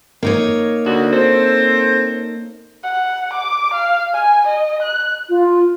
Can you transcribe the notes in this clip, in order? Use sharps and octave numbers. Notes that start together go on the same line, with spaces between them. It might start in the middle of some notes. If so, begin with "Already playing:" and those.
A#3 D#4 C#5
D2 D3 F#4
C4 A4 C5
F#5
D6
F5
G#5
D#5
F#6
F4